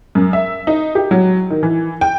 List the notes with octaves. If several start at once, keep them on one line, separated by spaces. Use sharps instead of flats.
F#2
E5
D#4
G4
F#3
D#3
E3
G5